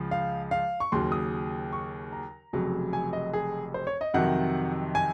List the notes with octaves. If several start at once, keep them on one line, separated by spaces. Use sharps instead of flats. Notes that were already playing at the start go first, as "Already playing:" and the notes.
Already playing: C#2 C#3 F3
F5
F5
C#6
D#2 C#3 F#3 C6
D#6
C#6
A#5
F1 F2 C#3 F#3
G#5
D#5
G#4
C5
C#5
D#5
F2 C3 D#3 F#3 F#5
G#5